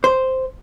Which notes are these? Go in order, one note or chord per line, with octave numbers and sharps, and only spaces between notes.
C5